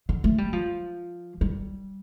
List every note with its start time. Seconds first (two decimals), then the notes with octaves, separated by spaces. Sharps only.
0.09 D3
0.24 A3
0.38 G3
0.53 F3
1.41 G3